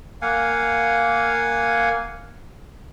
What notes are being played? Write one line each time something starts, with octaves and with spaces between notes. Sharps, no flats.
A#3 F5 F#5 G#5